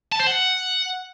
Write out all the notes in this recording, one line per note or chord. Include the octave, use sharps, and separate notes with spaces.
A5
C5
F#5